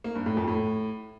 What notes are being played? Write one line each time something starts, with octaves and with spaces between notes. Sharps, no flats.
A#3
G2
A2
F2
A2